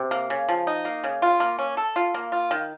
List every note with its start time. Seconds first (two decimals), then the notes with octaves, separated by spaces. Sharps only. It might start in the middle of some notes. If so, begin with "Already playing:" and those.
Already playing: C3
0.11 A#3
0.30 C#3
0.49 F3
0.67 D#4
0.85 A#3
1.04 C#3
1.22 F4
1.40 A#3
1.59 C#4
1.77 A4
1.96 F4
2.14 A#3
2.32 F4
2.51 D#3